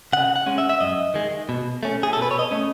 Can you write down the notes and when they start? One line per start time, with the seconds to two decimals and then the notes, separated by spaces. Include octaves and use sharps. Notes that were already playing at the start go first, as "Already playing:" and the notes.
0.13 C#3 F#5
0.36 F#5
0.46 G#3 C#4
0.58 E5
0.69 E5
0.81 F#2 D#5
1.14 D#3 G#3
1.49 B2
1.83 A3 C#4
2.03 G#4
2.13 A4
2.17 B2
2.22 B4
2.31 C#5
2.39 D#5
2.51 A3 C#4